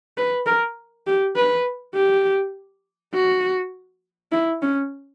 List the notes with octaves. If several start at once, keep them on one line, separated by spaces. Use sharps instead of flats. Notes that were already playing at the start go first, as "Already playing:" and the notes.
B4
A#4
G4
B4
G4
F#4
E4
C#4